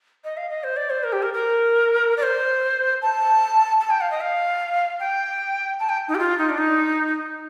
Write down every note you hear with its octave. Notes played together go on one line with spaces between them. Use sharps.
D#5
F5
D#5
C5
D5
C5
A#4
G4
A#4
A#4
D5
C5
A5
A5
G5
F5
D#5
F5
G5
A5
G5
D#4
G4
F4
D#4
D4
D#4